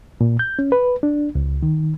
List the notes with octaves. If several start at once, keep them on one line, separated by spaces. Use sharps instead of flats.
A#2
G6
C#4
B4
D4
C#2
D#3